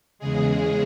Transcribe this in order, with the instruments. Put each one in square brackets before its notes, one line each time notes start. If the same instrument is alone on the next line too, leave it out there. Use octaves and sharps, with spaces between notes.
[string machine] E2 C#3 G#3 G#4